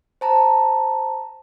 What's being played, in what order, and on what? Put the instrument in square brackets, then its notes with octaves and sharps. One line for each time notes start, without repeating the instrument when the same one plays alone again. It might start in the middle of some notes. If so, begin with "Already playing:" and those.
[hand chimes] C5 A5 A#5